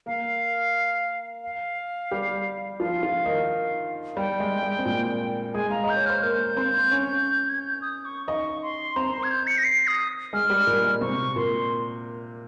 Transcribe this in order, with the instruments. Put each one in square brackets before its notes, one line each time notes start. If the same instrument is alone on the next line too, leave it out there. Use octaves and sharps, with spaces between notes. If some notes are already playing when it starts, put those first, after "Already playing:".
[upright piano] A#3 A#4 [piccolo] F5
[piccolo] F5
[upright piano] G3 G4
[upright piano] F3 F4 [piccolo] F5
[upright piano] F3 F4
D#3 D#4
[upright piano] G3 [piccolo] G5
[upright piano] G#3
G#3
C4
A#2 A#3
[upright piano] G#3 G#4 [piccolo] G#5
[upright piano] F5 [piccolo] A#5
[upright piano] D#5 [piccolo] G6
[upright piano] C#5
[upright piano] C5 [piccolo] F6
[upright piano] A#3 A#4 [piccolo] G6
[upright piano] C4 C5
C#4 C#5
[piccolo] G#6
G6
D#6
C#6
[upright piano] D#4 D#5 [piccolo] C#6
[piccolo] C6
[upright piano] C4 C5 [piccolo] A#5
[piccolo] C6
G#6
G6
C#7
A#6
C7
D#6
[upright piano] G#3 G#4 [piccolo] F6
[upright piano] G3 G4
A#2 A#3
G#3
[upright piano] C3 C4 [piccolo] C#6
[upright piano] A#2 A#3 [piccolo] C6